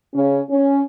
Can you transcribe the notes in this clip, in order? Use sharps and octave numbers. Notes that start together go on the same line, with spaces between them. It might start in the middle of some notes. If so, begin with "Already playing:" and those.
C#3 C#4
C#4